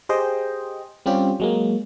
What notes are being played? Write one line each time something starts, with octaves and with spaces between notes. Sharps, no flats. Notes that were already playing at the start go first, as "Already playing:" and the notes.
G4 G#4 C5 D#5 G5
G3 C4 C#4 F4 G4
F#3 G#3 A#3